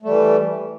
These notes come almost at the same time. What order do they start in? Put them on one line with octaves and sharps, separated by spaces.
A3 G3 E3